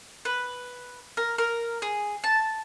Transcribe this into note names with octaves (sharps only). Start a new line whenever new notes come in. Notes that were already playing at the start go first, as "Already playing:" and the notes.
B4
A#4
A#4
G#4
A5